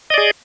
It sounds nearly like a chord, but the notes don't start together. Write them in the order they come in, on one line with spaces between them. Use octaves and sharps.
D#5 D5 G#4